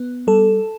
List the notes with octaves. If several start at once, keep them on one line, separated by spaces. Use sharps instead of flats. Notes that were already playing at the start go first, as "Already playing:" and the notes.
Already playing: B3
G3 A4